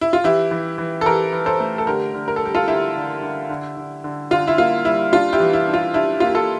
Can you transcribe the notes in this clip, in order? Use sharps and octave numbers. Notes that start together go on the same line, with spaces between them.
E4
F4
E3 E4 G4
E3
E3
A4
E3 G4 A#4
E3
A4 C5
A3
A4
D3 G4 A#4
D3
A#4
A4
G3 G4
F4 A4
D3 E4 G4
D3
D3
D3
D3
D3
D3 F4
E4
A#3 F4
G3 E4
D4 F4
E4 G4
E3
E4
D4
F4
D4 E4 G4
A#3 F4
G4
F4 A4